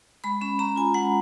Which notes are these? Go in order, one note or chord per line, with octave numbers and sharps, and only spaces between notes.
G#3 B5
C#4 B5
C#4 A#5
F4 G#5
G#3 F#5